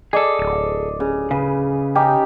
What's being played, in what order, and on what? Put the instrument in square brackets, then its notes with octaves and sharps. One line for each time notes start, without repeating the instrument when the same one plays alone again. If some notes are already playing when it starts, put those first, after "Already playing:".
[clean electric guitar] G#4 A4 [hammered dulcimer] D5 D#5
[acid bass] D1
[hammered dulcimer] C#3
[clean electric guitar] C#3 [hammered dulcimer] B4
[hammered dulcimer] C#4 D#4 G4